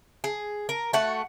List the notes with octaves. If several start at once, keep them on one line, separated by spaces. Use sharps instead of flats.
G#4
A#4
A3 F#4 F#5